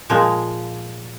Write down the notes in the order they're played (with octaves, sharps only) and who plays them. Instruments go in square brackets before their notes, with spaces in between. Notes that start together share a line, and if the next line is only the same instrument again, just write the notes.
[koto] A#2 F3 G#3